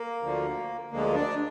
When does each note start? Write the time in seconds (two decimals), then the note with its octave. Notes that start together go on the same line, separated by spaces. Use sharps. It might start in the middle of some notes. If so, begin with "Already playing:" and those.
Already playing: A#3
0.22 D2 D3 F3
0.91 D2 D3 F3 G#3 A#3
1.14 D4